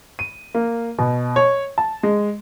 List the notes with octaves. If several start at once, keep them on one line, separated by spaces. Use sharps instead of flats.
D#7
A#3
B2
C#5
A5
G#3